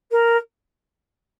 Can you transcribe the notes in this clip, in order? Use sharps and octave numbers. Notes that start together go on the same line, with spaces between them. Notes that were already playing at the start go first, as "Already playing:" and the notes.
A#4